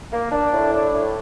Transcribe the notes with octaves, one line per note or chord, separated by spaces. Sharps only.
A#3
D4
A2
D4
A2